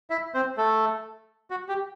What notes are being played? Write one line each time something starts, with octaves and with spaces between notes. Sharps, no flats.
E4 E5
C4 C5
A3 A4
F#4
G4